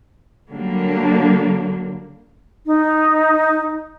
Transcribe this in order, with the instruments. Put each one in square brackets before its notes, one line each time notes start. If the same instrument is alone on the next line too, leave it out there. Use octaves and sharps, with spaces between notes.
[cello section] D3 F#3 G3 A#3 D4
[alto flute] D#4